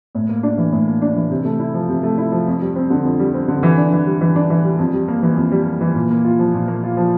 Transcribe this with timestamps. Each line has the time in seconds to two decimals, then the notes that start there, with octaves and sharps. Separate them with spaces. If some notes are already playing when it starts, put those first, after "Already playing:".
0.15 A2
0.29 A#3
0.43 D4
0.58 E3
0.72 A2
0.87 A#3
1.02 D4
1.16 E3
1.31 C3
1.45 A3
1.60 E4
1.74 F3
1.89 C3
2.03 A3
2.18 E4
2.32 F3
2.47 F2
2.61 G3
2.76 C4
2.90 D3
3.05 F2
3.19 G3
3.34 C4
3.48 D3
3.63 E3
3.78 D4
3.92 E3
4.06 G3
4.21 E3
4.36 D4
4.50 E3
4.65 G3
4.79 F2
4.94 G3
5.08 A#3
5.23 E3
5.37 F2
5.52 G3
5.66 A#3
5.81 E3
5.95 A#2
6.10 A#3
6.24 F4
6.39 F3
6.54 A#2
6.68 A#3
6.83 F4
6.97 F3